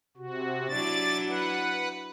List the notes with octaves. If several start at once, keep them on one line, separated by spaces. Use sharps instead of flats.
C3 F#4
F#3 D4 E4 D5 A6
B4 F#5